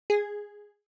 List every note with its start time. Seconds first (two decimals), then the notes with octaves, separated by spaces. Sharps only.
0.10 G#4